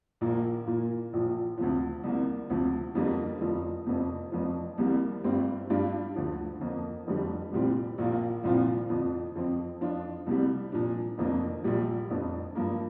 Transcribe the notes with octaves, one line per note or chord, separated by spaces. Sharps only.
A#1 A#2 A#3
A#2 A#3 F4
A#1 A#2 F3
D2 C3 F3
C2 C3 A#3
D2 C3 F3
F2 D3 G3 A#3
F1 F2 F3
F1 F2 C3
F1 F2 F3
C2 C3 G3 A#3
G1 G2 G3 C4
G2 G3 D4 F4
D2 D3 F3
F2 F3 A#3
F1 F2 D3 G3
C2 A#2 G3 C4
A#1 A#2 A#3 F4
C2 A#2 F3 C4 F4
F2 D3 F3 D4
F2 F3 C4
F2 F3 D4 F4
C2 C3 G3
A#2 F3 D4
F1 F2 C3 A#3 D4
A#1 A#2 G3
F1 F2 F3 D4
G2 F3 A#3